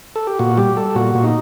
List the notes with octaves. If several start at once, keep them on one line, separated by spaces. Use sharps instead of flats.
A4
G4
A#2 F#4
G3 G4
G3 A4
A#2 F#4
A#2
D#4